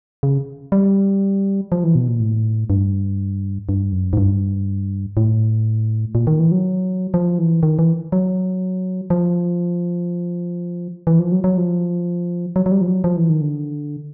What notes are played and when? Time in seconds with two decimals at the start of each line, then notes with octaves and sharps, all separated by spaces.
0.23 C#3
0.72 G3
1.72 F3
1.84 E3
1.95 B2
2.08 A#2
2.20 A2
2.70 G2
3.69 G2
3.92 F#2
4.13 G#2
4.17 G2
5.17 A2
6.15 A#2
6.27 D#3
6.39 E3
6.52 F#3
7.14 F3
7.38 E3
7.63 D#3
7.79 E3
8.12 F#3
9.10 F3
11.07 E3
11.19 F3
11.32 F#3
11.44 F#3
11.57 F3
12.56 F#3
12.66 F#3
12.72 G3
12.81 F3
12.88 F#3
13.04 F3
13.16 E3
13.30 D#3
13.41 D3